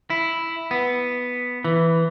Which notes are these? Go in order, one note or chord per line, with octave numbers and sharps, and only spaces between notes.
E4
B3
E3